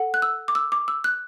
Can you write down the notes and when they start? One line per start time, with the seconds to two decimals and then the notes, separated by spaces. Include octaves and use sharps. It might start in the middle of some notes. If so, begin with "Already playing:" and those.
Already playing: A4 F#5
0.14 F#6
0.22 E6
0.48 D6
0.55 E6
0.72 D6
0.88 E6
1.04 F#6